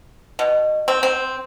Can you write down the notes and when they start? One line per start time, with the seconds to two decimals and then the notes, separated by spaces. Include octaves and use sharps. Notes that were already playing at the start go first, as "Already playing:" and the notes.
0.39 B2
0.88 C4
1.03 C4